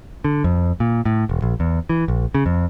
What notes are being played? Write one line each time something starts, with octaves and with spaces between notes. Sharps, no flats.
D3
F2
A#2
A2
E1
A#1
E2
E3
A#1
C#3
F2